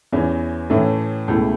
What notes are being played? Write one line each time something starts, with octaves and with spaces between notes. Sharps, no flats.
E2 E3 C#4
A2 E3 A3 C#4
C#2 B2 A3 E4